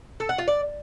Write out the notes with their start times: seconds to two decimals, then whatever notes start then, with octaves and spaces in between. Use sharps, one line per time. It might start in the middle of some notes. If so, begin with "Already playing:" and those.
0.20 A4
0.29 F#5
0.38 F4
0.48 D5